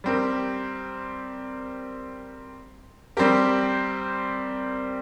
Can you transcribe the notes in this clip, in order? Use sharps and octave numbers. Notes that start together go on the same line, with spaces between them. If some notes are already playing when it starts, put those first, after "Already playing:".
G3 C4 G4 A#4
G3 C4 G4 A#4